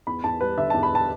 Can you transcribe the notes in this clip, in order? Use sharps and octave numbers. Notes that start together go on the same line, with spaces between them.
E2 B5
E2 A5
G3 B4
D3 E5
E2 A5
B5
A5